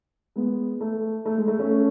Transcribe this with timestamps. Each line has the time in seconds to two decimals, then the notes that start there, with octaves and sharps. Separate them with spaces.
0.36 G#3 B3
0.81 A3
1.26 A3
1.37 G#3
1.48 A3
1.59 A3 C#4